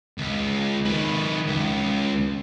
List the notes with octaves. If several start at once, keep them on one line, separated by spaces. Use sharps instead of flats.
C#2
D#3 B4
C#2